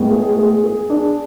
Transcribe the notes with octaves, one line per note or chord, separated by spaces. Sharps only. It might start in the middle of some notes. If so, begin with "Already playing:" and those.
Already playing: A2 G#3 B3
G#4
G#4
G#4
D4